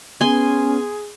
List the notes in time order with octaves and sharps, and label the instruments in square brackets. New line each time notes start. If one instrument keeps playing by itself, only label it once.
[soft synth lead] B3 [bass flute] C#4 [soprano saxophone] G#4 [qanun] G#5 C6